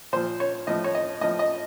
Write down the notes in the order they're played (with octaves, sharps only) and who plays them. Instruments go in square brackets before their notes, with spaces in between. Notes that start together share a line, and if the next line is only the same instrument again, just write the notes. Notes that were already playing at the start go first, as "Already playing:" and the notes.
[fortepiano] A#2 F3 C5
C#5
A2 F3 D#5
C#5
D#5
A2 F3 D#5
D#5